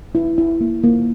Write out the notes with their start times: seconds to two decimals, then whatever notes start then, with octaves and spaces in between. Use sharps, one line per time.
0.15 E4
0.38 E4
0.61 A#3
0.83 A#3